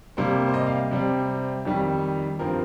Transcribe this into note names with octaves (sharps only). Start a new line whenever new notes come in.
C3 G3 A#3 C5
C5
D#5
F5
C3 G3 C4
F2 D#3 G3
G2 F3 C4 A#4